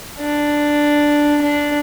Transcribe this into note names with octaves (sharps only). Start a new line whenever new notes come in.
D4
D4